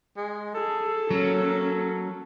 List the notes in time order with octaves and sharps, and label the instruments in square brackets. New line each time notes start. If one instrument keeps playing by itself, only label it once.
[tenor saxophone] G#3
[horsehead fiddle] G#4 [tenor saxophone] A4
[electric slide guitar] F#3 [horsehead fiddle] A#3 C#4